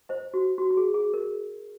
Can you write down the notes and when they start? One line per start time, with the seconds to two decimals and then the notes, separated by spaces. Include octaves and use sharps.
0.09 C5 D#5
0.34 F#4
0.58 F#4
0.71 F#4
0.77 G#4
0.94 G#4
1.14 A#4